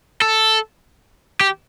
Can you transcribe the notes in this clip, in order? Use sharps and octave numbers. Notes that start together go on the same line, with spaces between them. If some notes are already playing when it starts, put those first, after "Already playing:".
A4
G4